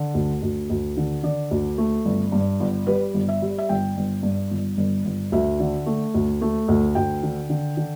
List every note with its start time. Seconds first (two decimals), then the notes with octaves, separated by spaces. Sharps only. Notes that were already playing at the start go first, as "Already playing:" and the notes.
Already playing: D3
0.14 D2
0.42 D2
0.70 D2
0.97 D3
1.23 D3 D5
1.51 D2
1.78 A3
2.05 G1
2.32 G2
2.60 G1
2.87 G3 B4
3.14 G1
3.28 E5
3.42 G3
3.58 E5
3.69 G1 G5
3.97 G1
4.23 G2
4.51 G1
4.77 G1
5.05 G1
5.32 D2 E5
5.60 D3
5.86 A3
6.14 D2
6.41 A3
6.68 D2
6.95 D2 G5
7.23 D3
7.50 D3
7.77 D3